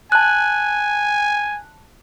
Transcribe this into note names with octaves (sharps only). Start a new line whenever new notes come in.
G#5 A5 F#6